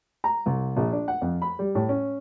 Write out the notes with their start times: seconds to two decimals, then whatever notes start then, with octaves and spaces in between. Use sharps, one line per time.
0.24 A#5
0.46 C2
0.77 A#1
0.92 D4
1.08 F#5
1.22 F2
1.42 B5
1.59 G3
1.75 A2
1.89 C#4